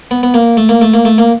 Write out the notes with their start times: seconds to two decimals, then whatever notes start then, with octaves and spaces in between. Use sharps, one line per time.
0.11 B3
0.23 B3
0.34 A#3
0.57 A3
0.69 A#3
0.81 A3
0.94 A#3
1.05 A3
1.18 A#3